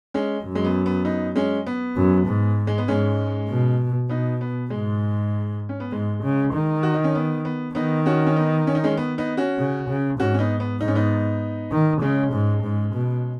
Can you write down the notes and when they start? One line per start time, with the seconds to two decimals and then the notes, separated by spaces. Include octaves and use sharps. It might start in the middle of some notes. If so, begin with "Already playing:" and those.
0.14 G#3 C#4
0.44 F#2
0.55 G#3
0.65 B3
0.86 B3
1.05 B3 D#4
1.36 G#3 C#4
1.67 B3
1.96 F#2
2.27 G#2
2.67 G#3
2.78 B3
2.88 G#2 G#3 C#4
3.49 B2
4.09 B2 B3 D#4
4.41 B3
4.70 G#2 G#3
5.69 C#4
5.80 B3
5.92 G#2 G#3
6.23 C#3
6.54 D#3
6.83 F#4
6.94 D#4
7.04 C#4
7.15 B3
7.45 B3
7.75 D#3 B3 D#4
8.06 C#4 F#4
8.26 C#4
8.36 B3 D#4
8.67 C#4
8.75 D#4
8.84 G#3 C#4
8.97 B3
9.18 B3 D#4
9.37 C#4 F#4
9.58 C#3
9.89 C#3
10.19 G#2 C#4 F#4
10.34 C#4
10.39 B3 D#4
10.60 B3
10.80 G#2 D#4
10.88 C#4
10.95 B3 D#4
11.72 D#3
12.02 C#3 G#3 C#4
12.33 G#2
12.63 G#2
12.93 B2